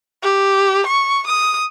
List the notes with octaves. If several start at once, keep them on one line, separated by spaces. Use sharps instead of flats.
G4
C#6
D#6